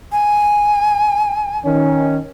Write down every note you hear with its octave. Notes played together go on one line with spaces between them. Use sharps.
G#5
D#3 C#4